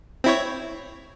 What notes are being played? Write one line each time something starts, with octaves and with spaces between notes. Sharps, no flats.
C4 E4 C#5